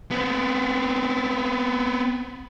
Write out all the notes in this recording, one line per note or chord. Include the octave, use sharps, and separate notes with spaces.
B3 C4